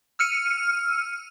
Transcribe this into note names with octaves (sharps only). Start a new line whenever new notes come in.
E6 F6 C#7 D#7